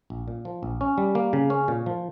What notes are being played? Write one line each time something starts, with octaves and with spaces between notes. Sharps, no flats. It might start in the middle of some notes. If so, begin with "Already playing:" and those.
A#1
A#2
F3
A#1
C#4
G3
A#3
C#3
C#4
A#2
F3